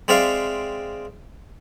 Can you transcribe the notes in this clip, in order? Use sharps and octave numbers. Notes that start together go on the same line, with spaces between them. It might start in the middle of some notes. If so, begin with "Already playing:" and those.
G#3 C4 D5 E5 F5